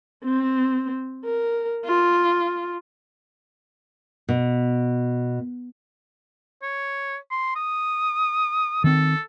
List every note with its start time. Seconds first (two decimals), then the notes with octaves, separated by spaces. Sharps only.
0.24 C4
1.24 A#4
1.85 F4
4.29 B2
6.62 C#5
7.31 C6
7.56 D#6
8.84 D#3 C4 A4